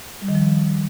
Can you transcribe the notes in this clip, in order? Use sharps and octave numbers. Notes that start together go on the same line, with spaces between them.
G3
D#3
F3